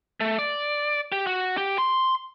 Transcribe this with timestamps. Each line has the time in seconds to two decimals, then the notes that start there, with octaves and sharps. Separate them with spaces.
0.20 A3
0.39 D5
1.12 G4
1.27 F#4
1.57 G4
1.78 C6